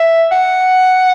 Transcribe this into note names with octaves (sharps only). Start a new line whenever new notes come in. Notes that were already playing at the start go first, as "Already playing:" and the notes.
Already playing: E5
F#5